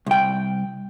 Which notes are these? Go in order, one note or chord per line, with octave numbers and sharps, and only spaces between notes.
C2 G5